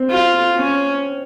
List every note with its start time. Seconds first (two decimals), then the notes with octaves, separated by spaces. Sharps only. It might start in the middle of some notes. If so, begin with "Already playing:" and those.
Already playing: C4
0.10 F4
0.57 C#4